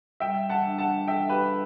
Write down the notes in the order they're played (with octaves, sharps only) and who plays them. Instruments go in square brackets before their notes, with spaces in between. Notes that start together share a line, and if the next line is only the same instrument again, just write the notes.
[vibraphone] G3 [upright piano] E5 G5
[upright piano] F#5 A5
[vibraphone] D4
[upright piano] F#5 A5
[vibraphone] A4 [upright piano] E5 G5
[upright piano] G4 B4